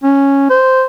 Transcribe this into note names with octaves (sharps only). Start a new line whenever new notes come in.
C#4
C5